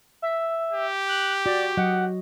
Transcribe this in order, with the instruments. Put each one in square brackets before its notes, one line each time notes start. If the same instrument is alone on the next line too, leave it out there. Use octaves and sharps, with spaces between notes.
[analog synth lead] E5
[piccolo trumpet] G4
[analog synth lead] F#6
[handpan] F#4 [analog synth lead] D5
[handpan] F#3 D#5 [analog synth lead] F#5